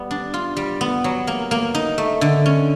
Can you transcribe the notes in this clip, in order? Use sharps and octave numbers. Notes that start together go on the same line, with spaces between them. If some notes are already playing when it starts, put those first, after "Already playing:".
Already playing: G3 B3
D4
F4
G3
B3
F#3
A#3
A#3
D#4
A3
D3
C#4